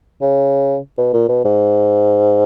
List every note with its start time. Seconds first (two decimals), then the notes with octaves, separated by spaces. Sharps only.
0.22 C#3
0.98 B2
1.13 A#2
1.29 B2
1.45 G#2